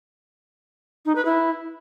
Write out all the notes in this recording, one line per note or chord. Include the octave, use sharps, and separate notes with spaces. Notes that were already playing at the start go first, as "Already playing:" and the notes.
D#4
B4
E4